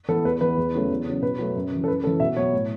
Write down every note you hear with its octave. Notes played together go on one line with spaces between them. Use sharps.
E3 B3 A4
E2 B4
E3 B3 B4
E2
C#3 F#3 A3
E2
C#3 F#3
B2 B4
F#3 A3
F#2
C#3 E3
A4
F#2 B4
C#3 E3 A4
B2 E5
F#3 B3 C#5
A2